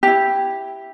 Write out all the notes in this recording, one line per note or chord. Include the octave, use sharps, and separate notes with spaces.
E4 G4